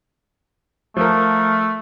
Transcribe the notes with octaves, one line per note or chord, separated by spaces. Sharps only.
F3 A3 A#4